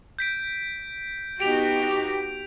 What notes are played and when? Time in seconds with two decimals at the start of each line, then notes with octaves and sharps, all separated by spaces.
0.19 G6 B6 D7
1.40 B3 D#4 F#4 G4 D7 F7